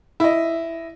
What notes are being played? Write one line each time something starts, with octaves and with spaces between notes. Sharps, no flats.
E4 D#5